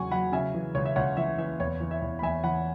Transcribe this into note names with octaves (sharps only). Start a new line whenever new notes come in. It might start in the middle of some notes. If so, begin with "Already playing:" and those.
Already playing: E2 C#3 F#3 F#5 G#5 C#6
F#3 F#5 B5
C#3 E5 G#5
E3
C#2 C#5
E5
C#2 C#5 F#5
E3 E5
E3 E5
E2 C#5
E3
E5
E2
B5
E2 E5 G#5
E3 F#5 B5